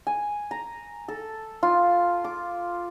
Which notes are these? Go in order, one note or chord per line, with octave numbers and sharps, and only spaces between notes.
G#5
A#5
A4
F4
D6